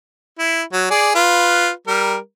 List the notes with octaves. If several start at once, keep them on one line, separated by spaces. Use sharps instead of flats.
E4
F#3
G#4 D5
F4 B4
G3 A#4